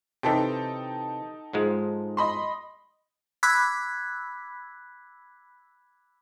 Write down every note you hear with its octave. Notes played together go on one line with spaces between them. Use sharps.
C3 E3 D#4 A4 G5
G#2 F3 G#3
D#5 B5 C6
B5 D6 E6 F#6 G#6 B6